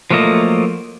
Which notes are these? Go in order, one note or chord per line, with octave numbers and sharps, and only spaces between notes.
F3 F#3 A3 A#3 D#5